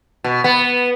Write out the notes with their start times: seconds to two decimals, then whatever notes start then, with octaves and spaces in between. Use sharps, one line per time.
0.24 B2
0.44 B3